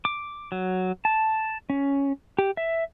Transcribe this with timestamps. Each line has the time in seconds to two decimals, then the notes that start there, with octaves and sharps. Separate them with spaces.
0.05 D6
0.52 F#3
1.05 A5
1.70 C#4
2.38 G4
2.57 E5